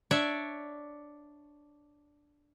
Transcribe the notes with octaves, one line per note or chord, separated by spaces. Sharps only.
D4 C#5 D5 E5